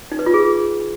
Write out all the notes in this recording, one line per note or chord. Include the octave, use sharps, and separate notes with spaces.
D#4
B4
F4
G#4